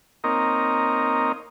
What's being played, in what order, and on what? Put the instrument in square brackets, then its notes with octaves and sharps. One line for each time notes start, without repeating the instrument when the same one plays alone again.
[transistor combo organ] A#3 C4 D#4 A#4 C#5 D#5